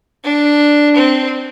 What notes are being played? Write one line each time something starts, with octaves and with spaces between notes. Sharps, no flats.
D4
C4